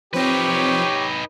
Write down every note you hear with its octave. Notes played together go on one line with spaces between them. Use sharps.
F3 C4 D#4 G4 B4 C#5